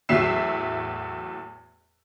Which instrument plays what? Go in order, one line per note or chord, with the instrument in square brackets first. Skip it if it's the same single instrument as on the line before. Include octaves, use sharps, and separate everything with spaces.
[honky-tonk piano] E2 A2 F#3 E5 C7 E7